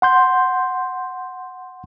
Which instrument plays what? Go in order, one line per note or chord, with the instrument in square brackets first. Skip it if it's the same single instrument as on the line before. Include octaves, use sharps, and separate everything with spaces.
[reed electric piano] F#5 C6 G6